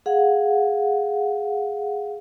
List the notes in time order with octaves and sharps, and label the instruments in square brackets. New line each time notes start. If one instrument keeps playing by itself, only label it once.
[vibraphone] G#4 F5 F#5